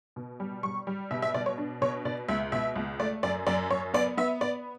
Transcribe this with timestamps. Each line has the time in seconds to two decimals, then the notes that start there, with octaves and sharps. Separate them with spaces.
0.16 B2
0.40 G3
0.63 G3 C#6
0.87 G3
1.11 B2 E5
1.22 E5
1.34 B2 D5
1.46 C#5
1.58 D4
1.82 B2 C#5
2.05 B2 D5
2.28 C#2 E5
2.52 B2 E5
2.76 C#2
2.99 A3 D5
3.23 F#2 D5
3.47 F#2 D5
3.70 F#2 C#5
3.94 B3 D5
4.17 B3 E5
4.41 B3 D5